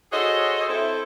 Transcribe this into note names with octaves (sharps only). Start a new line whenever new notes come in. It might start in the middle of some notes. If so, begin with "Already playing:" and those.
F#4 G#4 A4 C5 C#5 D#5
C4 E4 A4